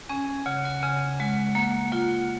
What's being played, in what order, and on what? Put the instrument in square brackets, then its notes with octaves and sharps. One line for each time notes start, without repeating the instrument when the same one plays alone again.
[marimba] C#4 [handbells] G#5
[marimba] C#3 [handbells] F#5
[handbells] F#5
[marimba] C#3 [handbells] G#5
[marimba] G#3 [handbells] F#5
[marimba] A#3 [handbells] F#5
[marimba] F4 [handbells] F#5